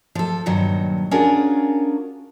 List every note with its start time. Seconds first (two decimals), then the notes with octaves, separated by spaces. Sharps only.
0.15 F3 A4
0.46 G2 A#2 D#3 F#3
1.11 C#4 D4 F4 F#4 G#4 A#4